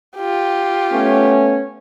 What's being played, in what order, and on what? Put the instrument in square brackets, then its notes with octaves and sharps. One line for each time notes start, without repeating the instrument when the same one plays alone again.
[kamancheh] F4 G4
[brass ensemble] A3 B3 C#4